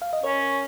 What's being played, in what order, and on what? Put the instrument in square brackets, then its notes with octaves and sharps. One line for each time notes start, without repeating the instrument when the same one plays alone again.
[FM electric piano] F5
D#5
[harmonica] C#4 [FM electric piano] A#4 C#5